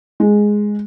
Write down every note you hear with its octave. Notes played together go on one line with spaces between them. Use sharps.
G#3